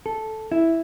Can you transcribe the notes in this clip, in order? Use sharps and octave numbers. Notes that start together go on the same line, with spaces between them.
A4
E4